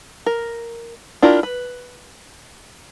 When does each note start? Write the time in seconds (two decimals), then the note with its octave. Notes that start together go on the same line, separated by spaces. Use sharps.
0.26 A#4
1.22 D4 E4 F4 G4 A#4
1.43 B4